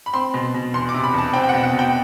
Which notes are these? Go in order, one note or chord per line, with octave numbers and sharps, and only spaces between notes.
B5
C4 C6
B2
B2
E2 C6
D6
C3
B5
E2 A5
C4 G5
G5
B2 F#5
F#5
B2
G5